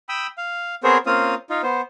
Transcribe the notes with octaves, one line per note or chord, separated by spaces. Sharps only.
G5 B5 D#6 E6
F5
B3 C4 G#4 A#4 C5 C#5
A#3 C4 C#4 F4 F5 D#6
D#4 F4
B3 C5